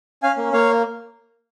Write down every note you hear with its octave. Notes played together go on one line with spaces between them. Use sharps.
C#4 F5 G#5
A#3
A#3 C#5 F5